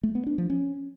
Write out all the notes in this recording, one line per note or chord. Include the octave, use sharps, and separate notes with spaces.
A3
B3
D4
F3
C#4